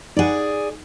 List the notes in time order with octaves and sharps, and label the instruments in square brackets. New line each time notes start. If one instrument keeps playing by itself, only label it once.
[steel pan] D#4 F#5 [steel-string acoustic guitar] G#4 D5